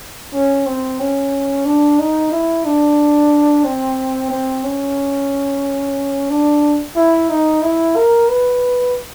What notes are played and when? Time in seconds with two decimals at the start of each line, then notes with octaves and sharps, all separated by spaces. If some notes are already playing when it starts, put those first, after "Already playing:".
0.33 C#4
0.66 C4
1.00 C#4
1.65 D4
1.99 D#4
2.31 E4
2.65 D4
3.64 C4
4.30 C4
4.64 C#4
6.30 D4
6.96 E4
7.29 D#4
7.62 E4
7.96 A#4
8.29 B4